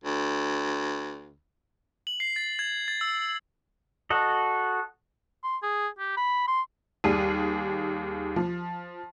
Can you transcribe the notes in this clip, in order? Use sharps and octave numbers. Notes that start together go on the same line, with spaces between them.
D2
F#7
C7
A6
G#6
A6
E6
F#4 A4 D#5
C6
G#4
G4
B5
C6
D#2 G3 G#4 D#7
F3